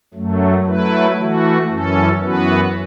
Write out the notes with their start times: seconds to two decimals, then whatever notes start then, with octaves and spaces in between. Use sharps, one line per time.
0.14 F#2 F#3 A3
0.65 F#3 A3 E4 B4
1.17 E3 A3 F#4
1.68 F#2 E3 C#4 A4
2.20 F#2 E3 B3 F#4 B4